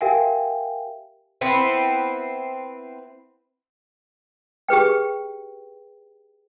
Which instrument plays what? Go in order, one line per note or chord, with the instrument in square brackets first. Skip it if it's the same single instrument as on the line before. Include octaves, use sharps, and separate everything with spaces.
[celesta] G4 A#4 E5 F5 G5 G#5
[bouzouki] B3 C4 E4 B4
[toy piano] G4 G#4 B4 G5